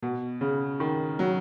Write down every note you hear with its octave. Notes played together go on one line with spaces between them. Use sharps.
B2
C#3
D#3
F#3